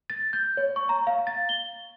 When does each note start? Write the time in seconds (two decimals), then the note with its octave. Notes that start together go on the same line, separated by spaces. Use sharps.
0.10 A6
0.33 G6
0.57 C#5
0.76 C#6
0.89 A#5
1.07 F5
1.27 A6
1.49 G7